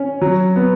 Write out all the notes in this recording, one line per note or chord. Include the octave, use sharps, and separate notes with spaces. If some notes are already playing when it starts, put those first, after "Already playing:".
Already playing: C#4
F#3
B3